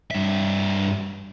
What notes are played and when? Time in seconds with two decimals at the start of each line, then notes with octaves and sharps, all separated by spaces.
0.11 G2 E5